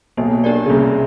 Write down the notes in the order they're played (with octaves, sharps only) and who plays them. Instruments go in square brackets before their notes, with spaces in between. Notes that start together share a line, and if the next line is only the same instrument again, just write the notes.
[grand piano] B1 B2 [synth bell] A#3
[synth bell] D4 G4 A#4 D5
[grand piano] C#3
[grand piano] C2 C3 [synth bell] A#3